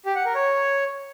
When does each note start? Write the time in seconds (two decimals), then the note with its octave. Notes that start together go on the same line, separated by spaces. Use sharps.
0.06 G4
0.15 F#5
0.25 A#4
0.35 C#5